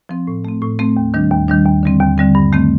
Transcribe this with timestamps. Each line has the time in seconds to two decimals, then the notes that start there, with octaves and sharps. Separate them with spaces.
0.09 F3 C4
0.27 A2
0.45 A3 C4
0.62 A2
0.79 A3 C4
0.97 D#2
1.14 D#3 G3 D4
1.31 D#2
1.48 D#3 G3 D4
1.66 D#2
1.83 D3 G3 C4
2.00 D#2
2.18 D3 G3 C4
2.35 G2
2.52 D#3 A3 C4